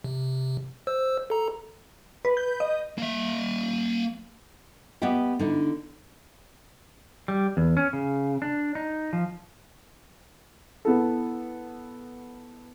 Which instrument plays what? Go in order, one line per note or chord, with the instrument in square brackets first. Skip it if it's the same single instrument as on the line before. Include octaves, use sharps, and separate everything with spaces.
[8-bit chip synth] C3
C5 E6
A4 A#5
[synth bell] B4
G6
D#5
[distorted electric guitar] A#3 E5
[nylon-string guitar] B3 G4 D#5 E5 G5
D3 D#4 E4
[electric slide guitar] G3
E2
C#4
C#3
D4
D#4
F3
[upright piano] B3 E4 A4